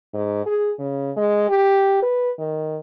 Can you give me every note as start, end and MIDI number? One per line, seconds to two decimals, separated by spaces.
0.14 0.45 44
0.46 0.72 68
0.79 1.11 49
1.17 1.48 56
1.49 2.00 67
2.02 2.31 71
2.39 2.78 51